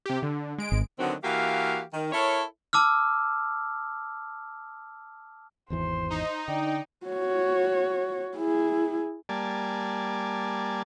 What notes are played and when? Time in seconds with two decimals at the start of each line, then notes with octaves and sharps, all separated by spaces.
0.06 C3 G4
0.23 D3
0.58 G#3 D7
0.72 G#1
0.99 D3 D#3 F#3 B3 C4 F#4
1.24 E3 A#3 F#4 G4 F5
1.93 D#3
2.13 E4 A4 A#4 C#5
2.73 A5 D6 E6 F6
5.70 G#1 E2 E3 C5 C6
6.10 D#4
6.48 D3 D5 G5
7.06 F#4 C#5
8.35 E4 G#4
9.29 G3 A#3 D5 G#5 A5